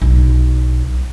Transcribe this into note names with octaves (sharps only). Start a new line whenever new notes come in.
B1